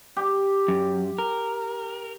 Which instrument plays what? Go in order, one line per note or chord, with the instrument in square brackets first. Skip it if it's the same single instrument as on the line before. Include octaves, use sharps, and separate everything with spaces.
[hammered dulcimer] G4
[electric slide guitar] F#2
A#4